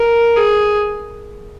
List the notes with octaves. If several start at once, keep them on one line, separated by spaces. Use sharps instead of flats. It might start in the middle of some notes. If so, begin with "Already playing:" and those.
Already playing: A#4
G#4